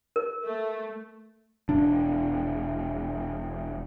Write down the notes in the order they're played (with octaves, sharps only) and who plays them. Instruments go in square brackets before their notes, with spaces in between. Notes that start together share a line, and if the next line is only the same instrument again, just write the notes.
[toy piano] A#4
[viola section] A3
[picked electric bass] E1 D4